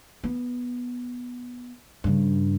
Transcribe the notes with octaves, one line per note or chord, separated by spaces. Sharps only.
B3
G2 C#3